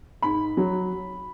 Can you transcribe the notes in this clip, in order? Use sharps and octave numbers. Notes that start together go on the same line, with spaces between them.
G#2 B5
F#3